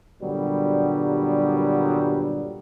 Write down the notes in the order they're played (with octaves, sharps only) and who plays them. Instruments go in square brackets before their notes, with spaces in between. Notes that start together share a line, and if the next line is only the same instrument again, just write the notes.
[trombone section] G2 A#2 D3 F#3 G3 B3